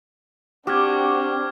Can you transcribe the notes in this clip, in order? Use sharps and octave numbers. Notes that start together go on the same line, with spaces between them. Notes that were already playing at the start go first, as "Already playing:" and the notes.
C4 D4 F#4 G4 D6 F6 G#6